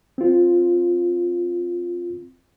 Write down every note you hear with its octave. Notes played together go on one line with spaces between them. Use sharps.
C4 F4